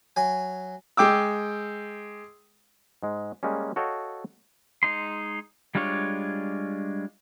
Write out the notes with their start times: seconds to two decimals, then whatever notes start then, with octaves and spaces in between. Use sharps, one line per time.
0.16 F#3 G#5
0.97 G#3 G5 D6 E6
3.03 G#2 G#3
3.43 G3 G#3 A#3 C#4
3.76 F#4 A4 C#5 D#5 F5 G5
4.83 G#3 D#4 C6
5.75 G3 G#3 D4 F4 C#5